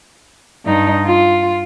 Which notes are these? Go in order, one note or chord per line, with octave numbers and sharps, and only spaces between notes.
G2 D#4
F4